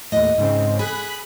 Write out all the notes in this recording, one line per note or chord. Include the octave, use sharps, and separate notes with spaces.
D#2 A2 D#5
G#2 C#3 C4
G#4 B5 F#6